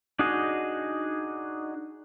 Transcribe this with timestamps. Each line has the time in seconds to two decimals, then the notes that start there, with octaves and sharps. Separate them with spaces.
0.19 D4 D#4 F#4 G#4 D#5